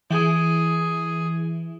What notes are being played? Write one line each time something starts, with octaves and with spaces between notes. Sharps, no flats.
E3 G#4